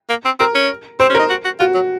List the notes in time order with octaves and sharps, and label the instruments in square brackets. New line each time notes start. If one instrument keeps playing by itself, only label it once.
[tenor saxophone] A#3
C4
[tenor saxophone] C4 [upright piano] A#4
[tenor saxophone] C#4
[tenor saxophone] C4 [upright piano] C5
[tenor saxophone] C#4
[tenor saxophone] D#4 [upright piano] A#4
[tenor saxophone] F#4
F#4
[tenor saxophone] F4 [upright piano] F#4
[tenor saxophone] F#3